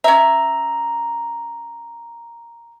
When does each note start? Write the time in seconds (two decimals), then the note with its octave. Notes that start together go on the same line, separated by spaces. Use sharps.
0.04 C#4 E5 A#5